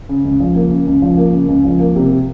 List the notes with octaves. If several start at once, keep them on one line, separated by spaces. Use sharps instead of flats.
C#3
C#2
F3
A#3
C#3
C#2
F3
A#3
C#3
C#2
F3
A#3
C3